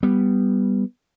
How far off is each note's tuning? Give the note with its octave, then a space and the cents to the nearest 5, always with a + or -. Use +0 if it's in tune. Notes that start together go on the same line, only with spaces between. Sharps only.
G3 +0 B3 +0